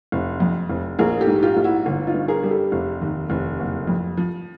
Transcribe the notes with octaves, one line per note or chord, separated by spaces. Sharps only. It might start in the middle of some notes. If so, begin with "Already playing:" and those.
F1
F2
F1
A#1 G#4 A#4
G4 A4
G#2
F4 G4
A#1
E4 F#4
G1
D#4 F4
G2
G#4 A#4
G3
G4 A4
F1
D#2
F1
F#1
F2
F3